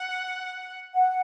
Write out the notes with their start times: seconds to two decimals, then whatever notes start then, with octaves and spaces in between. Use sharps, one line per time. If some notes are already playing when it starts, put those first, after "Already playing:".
Already playing: F#5
0.94 F#5